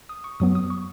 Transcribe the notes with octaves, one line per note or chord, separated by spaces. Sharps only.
D#6
C#6
F#2 F#3 B3 D#6
D#6
C#6